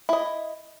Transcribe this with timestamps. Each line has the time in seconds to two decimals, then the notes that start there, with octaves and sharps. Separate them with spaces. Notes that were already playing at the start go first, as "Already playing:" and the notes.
0.09 E4 D#5